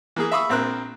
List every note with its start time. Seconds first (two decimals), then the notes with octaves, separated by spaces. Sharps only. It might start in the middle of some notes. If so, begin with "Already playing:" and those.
0.16 E3 A#3 G#4
0.32 E5 F5 B5 C#6 D#6 E6
0.49 A#1 C4 A#4 F#6